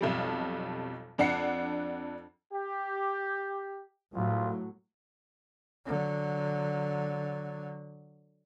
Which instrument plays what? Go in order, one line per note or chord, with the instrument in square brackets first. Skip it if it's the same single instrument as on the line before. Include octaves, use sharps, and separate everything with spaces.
[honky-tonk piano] B1 F2 G3
F2 D4 F#5 C7 C#7
[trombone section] G4
[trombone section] C2 F4 [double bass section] A2 F#3
[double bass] D3 F#3